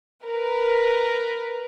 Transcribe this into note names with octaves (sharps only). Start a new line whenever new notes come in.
A#4 B4